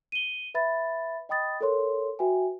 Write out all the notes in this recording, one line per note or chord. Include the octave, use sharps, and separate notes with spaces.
D#7 G7
B4 E5 B5 A6
D#5 G5 B5 D#6 A6
A4 A#4 C#5 C6
F#4 B4 E5 G5 G#5